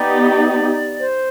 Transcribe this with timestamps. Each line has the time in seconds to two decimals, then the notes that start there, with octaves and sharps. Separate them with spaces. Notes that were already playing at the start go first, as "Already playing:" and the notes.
Already playing: B3 D#4 G4 D5
0.99 C5